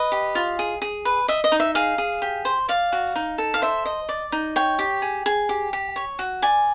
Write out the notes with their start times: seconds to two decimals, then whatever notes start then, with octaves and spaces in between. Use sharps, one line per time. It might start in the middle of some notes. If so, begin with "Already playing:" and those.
Already playing: B4 D#5
0.12 G4
0.35 F4
0.59 G#4
0.82 G#4
1.05 B4
1.28 D#5 E5
1.44 D#5
1.52 D#4
1.60 E5
1.75 G#4 F5
1.98 G#4
2.22 G4
2.45 C5
2.69 D5 F5
2.93 F#4
3.16 D#4
3.38 A4
3.54 F5
3.62 C5 E5
3.85 D#5
4.09 D5
4.32 D#4
4.56 C#5 G5
4.79 G4
5.02 G#4
5.26 G#4
5.49 G4
5.73 G4
5.96 C#5
6.19 F#4
6.42 D5 G#5